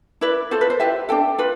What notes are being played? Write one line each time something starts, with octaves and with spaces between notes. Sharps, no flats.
E4 B4 D5
F4 A4 C5
B4
C5
E4 G4 B4 E5
D4 A4 G5
F4 B4